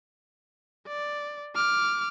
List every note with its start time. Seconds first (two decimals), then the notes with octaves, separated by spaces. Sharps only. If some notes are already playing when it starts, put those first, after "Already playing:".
0.88 D5
1.56 D6 F6